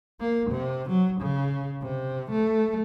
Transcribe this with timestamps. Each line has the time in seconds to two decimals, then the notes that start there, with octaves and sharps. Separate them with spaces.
0.21 A#3
0.51 C3
0.90 F#3
1.21 C#3
1.82 C3
2.31 A3